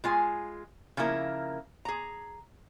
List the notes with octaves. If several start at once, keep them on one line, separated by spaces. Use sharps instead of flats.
G#3 F4 G#5
C#3 F3 A#3 E4 A#4
G#4 A#5